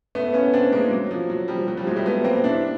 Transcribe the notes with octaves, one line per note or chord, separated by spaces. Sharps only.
A3 B3
B3 C#4
C4 D4
G#3 A#3
F#3
F3
F#3
F3 G3
F#3
F3 G3
F#3 G#3
G3 A3
A3 B3
A#3 C4
D4 E4